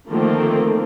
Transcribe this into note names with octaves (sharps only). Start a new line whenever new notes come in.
D3 D#3 F3 A3 A#3 C4